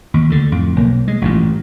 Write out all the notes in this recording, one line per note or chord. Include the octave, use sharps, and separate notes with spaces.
D#2
D2 D3
F2 A2
B1 A#3
G#3
A1 G2 A#2